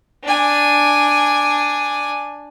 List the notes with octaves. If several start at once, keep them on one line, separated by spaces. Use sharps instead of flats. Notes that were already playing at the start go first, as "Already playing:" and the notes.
D4 G#5